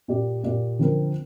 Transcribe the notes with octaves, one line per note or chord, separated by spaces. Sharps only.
A#2 A#3 G4 D5
A#2 A#3 G4 D5
D3 F3 C4 A#4